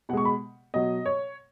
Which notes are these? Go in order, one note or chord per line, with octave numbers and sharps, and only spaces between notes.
B2 G#3 F#5 C#6
B5
B2 F#3 D#5
C#5